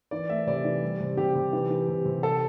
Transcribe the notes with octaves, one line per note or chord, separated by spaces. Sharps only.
E3 D5
A3 E5
C3 D5
E3
G3
C3
C3 G4
C3
E3
E3
C3
C3
A4